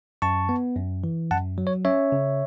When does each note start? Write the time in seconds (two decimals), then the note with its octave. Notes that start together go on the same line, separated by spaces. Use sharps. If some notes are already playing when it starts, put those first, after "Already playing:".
0.22 F#2 A5 C#6
0.49 B3
0.76 F#2
1.04 E3
1.31 F#2 F#5 A5
1.58 F#3
1.67 C#5
1.85 C#4 C#5 E5
2.12 C#3